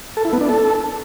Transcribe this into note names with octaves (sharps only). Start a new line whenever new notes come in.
A4
E4
B3
D4
A4